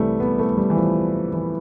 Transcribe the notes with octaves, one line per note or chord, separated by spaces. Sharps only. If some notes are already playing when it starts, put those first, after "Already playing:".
Already playing: C2 C3 E3 G3 A3
B3
A3
G3
E3
F3
E3